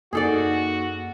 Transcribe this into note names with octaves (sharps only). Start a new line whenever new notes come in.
F#2 A#3 D#4 F#4 G#4 A4 D5